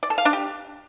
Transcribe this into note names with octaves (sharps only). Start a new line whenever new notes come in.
D5
A4
F5
D4
G4